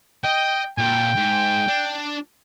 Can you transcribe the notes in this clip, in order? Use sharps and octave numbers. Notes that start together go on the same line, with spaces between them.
D#5 G5
A#2 A4 G5
G#2
D4